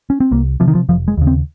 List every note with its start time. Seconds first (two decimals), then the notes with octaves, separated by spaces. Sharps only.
0.10 C#4
0.20 C4
0.31 C2 A#3
0.60 C3 F3
0.68 D#3
0.75 F3
0.89 F1 F3
1.08 G#3
1.17 D#2 C#3
1.27 C4